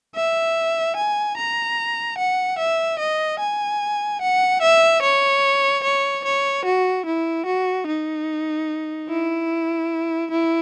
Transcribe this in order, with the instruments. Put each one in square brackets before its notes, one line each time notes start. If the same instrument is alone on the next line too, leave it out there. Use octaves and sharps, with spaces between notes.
[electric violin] E5
G#5
A#5
F#5
E5
D#5
G#5
F#5
E5
C#5
C#5
C#5
F#4
E4
F#4
D#4
E4
E4